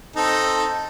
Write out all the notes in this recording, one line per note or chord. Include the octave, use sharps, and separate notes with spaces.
C4 D#4 A4